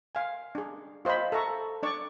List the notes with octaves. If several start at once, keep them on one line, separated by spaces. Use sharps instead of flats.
F5 G#5
D4 G#4
F4 C5 D#5 F5 B5
A4 E5 A#5 C#6
D4 D5 C#6